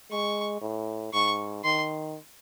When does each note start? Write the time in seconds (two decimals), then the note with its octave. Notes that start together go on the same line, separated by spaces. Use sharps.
0.11 G#3 C#6
0.61 A2
1.14 G#2 C#6
1.64 D#3 C6